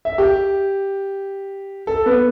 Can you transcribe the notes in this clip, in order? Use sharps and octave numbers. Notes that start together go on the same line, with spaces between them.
E5
G4
A4
B3